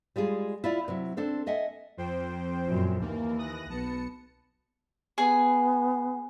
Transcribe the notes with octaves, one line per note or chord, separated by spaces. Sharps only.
G3 G#3 F4 G#4
E4 F4 D5 F5
C3 F#3 E4
C4 D4 A4 C5
A4 D#5 E5 F#5 G#5
F2 C5 G5
F#2 A#2
D#2 E3 A#3
D#6 F#6 A#6
B1 B3 A5 C#7
B3 G#4 G#5